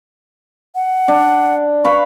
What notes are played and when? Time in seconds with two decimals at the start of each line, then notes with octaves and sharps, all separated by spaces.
0.75 F#5
1.08 D4
1.85 B4 F5 B5 C#6